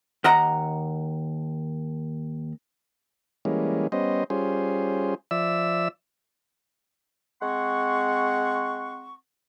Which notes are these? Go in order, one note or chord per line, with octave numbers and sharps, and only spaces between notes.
D#2 D#5 F#5 A#5
E3 G3 G#3 A#3 C#4
G3 B3 C#4 C5 D#5
G3 C#4 F4 G#4 C5
F3 D5 E5 E6
G#3 C4 F#5 C6 C#6